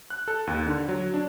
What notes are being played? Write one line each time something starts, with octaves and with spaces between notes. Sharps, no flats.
F#6
A4
D#2
D3
F#3
D4